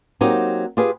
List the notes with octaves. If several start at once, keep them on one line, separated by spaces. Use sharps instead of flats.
F#3 A#3 C4 D#4 G4
F4 G4 G#4 B4